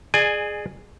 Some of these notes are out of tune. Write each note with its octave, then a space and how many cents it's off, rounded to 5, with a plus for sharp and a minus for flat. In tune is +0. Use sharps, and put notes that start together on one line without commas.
G#4 +5 D5 +35 G#5 -10